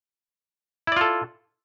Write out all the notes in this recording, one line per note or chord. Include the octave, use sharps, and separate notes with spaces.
E4 F4 A4 D5